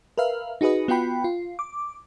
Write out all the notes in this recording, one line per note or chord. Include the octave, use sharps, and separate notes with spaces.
A#4 B4 E5 F5
D#4 F#4 G#4 B4 D#5
B3 F4 F#4 G5 B5
F4
D6